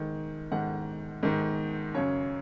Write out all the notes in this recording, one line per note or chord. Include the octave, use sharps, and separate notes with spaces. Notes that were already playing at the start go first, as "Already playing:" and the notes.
Already playing: G#2 D#3
G#2 D#3 F#5
G#2 D#3
F#2 C#3 C#5